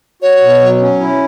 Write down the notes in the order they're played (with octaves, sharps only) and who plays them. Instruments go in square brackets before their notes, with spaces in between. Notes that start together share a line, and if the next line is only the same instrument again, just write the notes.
[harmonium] F#4 [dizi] C#5
[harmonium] B2
F#3
C#4
E4